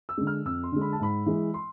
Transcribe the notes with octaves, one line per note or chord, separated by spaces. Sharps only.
E6
D3 G#3
F6
F2 E6
C6
D3 G#3
B5
A5
G#2 B5
E3 G#3
C6